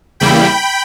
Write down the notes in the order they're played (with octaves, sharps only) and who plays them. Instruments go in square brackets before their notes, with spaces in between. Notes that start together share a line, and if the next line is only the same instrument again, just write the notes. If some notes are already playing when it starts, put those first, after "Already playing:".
[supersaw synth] E2 C#3 G3 A#3 E4 G5 B5